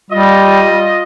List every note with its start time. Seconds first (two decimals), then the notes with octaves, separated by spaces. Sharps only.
0.10 G3 F4 D#5